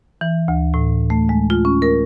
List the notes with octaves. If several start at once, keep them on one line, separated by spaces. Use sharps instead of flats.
E3
D2
A2
A3
G#3
F4
C#4
A#4